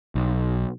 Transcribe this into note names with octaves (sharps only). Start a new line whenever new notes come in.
B1